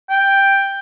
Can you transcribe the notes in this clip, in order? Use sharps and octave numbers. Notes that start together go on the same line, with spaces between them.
G5